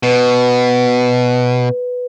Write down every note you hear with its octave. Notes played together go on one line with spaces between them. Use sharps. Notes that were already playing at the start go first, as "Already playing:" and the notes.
B2 B4